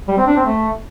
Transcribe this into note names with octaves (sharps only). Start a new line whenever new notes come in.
G3
C4
D4
C4
A3